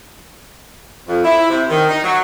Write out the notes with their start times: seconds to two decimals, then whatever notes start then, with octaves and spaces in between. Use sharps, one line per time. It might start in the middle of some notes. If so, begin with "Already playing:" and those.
1.08 F2
1.24 E4
1.49 C3
1.69 D#3
1.89 D#4
2.04 F#3